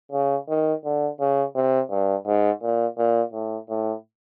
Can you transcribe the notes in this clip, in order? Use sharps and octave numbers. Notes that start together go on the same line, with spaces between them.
C#3
D#3
D3
C#3
C3
G2
G#2
A#2
A#2
A2
A2